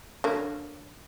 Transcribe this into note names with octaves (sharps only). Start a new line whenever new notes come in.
D3 F#3 A#3